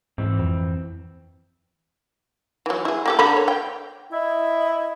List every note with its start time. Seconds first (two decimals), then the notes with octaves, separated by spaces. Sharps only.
0.18 G#2 E3 C4
0.39 F2
2.66 E3 F#3
2.85 E4 G#4
3.06 A#3 G4 A4
3.19 D3 A#4 B5
3.37 C#5
3.48 G5
4.12 E4 D#5